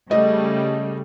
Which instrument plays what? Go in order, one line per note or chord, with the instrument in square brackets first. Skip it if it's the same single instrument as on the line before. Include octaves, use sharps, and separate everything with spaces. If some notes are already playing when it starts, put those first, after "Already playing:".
[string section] C#3 G3 A3 [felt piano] D#5